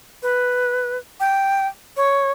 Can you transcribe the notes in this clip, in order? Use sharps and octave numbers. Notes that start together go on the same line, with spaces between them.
B4
G5
C#5